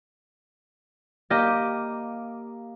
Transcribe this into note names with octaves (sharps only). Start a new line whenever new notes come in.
A#3 G4 D#5